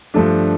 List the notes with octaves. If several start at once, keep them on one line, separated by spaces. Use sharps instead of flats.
G2 F3 A3 D4